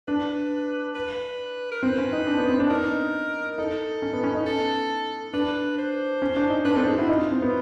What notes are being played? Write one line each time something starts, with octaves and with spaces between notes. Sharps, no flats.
D4 B4
B4
A#4
C4 B4
C#4
D#4
D4
B3
C4
D4
D#4 A#4
D#4 A4
C#4
B3
C#4
D#4
A4
D4 B4
C5
C#4
D4
D#4
D4 B4
C4 A4
D#4 G#4
E4 F#4
D#4 F4
C4
B3